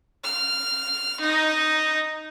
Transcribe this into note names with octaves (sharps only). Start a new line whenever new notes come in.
F6
D#4